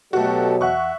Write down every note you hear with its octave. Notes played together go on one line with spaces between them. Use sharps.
B2 F#3 A3 F#4 G4 A4
E2 E5 F#5 C#6 F#6